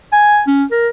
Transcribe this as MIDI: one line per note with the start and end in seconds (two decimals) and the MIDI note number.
0.13 0.42 80
0.47 0.64 61
0.71 0.88 70